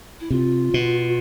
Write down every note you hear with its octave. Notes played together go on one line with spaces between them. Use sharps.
E4
C3 F4
B2